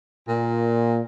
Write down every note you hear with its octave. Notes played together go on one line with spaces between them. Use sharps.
A#2